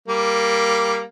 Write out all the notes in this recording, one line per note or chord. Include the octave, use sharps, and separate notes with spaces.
G3 A#3